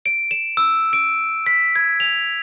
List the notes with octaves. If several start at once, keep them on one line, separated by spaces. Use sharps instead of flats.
D7
E7
E6
D7
B6
G#6
F7